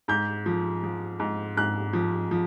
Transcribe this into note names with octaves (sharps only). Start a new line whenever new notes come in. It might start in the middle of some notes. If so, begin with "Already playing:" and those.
G#2 G6
F3
F3
G#2
G#2 F#6
F3
F3